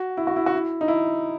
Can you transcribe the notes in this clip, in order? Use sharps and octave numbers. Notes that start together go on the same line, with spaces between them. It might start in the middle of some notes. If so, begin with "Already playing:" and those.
Already playing: F#4
E4
F#4
E4
F#4
E4
D#4
E4